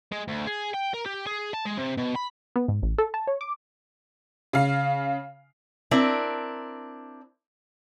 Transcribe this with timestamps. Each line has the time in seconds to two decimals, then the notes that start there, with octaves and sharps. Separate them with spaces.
0.12 G#3
0.28 D2
0.47 G#4
0.74 G5
0.94 A#4
1.06 G4
1.27 G#4
1.54 A5
1.66 G#3
1.78 C3
1.97 B2
2.16 B5
2.56 B3
2.68 G#2
2.82 A1
2.98 A4
3.14 A5
3.27 C#5
3.41 D6
4.53 C#3 F5
5.91 C4 D4 E4 A#4